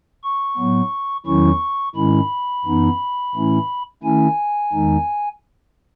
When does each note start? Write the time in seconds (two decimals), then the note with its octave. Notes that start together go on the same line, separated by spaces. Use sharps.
0.23 C#6
0.57 A2 F#3 B3
1.26 E2 D#3 F#3 C#4 E4 C#6
1.96 G#2 D#3 G#3 C#4 E4 B5
2.65 F#2 E3 B3 D#4
3.35 A2 E3 A3 C#4 E4
4.03 D#3 A3 C#4 E4 G#5
4.73 E2 D#3 G#3 D#4